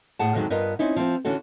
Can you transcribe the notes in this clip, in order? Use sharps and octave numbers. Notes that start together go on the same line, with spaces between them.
A2 G#4 F#5 A5
F2 D3 D#3 F#3 G#3
G2 B3 F4 A#4 D#5
C4 C#4 D#4 E4
F3 C4
D3 E3 C#4 F#4 A4